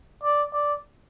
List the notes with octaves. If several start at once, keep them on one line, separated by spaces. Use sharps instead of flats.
D5
D5